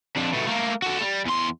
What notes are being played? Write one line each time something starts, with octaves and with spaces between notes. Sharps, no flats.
F2 D4
B2 A3
A3 A#3
F#4 A4
G3
E2 C6